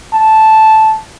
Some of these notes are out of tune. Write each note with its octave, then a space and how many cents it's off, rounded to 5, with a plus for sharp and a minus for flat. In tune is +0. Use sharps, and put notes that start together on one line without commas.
A5 -5